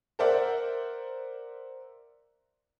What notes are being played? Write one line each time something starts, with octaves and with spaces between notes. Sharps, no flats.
A#4 C5 D5 E5 F#5